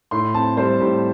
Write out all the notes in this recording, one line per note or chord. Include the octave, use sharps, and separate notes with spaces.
A2 C6
C4 A5
G3 C5
A2 G4